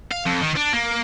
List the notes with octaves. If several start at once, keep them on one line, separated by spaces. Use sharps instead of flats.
F5
F2
D#3
D4
A#3